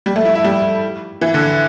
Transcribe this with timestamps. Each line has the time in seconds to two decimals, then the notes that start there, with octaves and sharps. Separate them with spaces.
0.06 G3
0.16 A3
0.25 E4
0.35 E4
0.44 G3
1.21 E3
1.34 D3